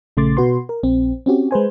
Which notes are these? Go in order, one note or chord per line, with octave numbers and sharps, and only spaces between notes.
A#1 C#3 A3 C6 D6 A6
B2 F#4 B4 C6
A#4
A#1 C4
C4 C#4 F#4 G4
G#3 B4 C5 G#5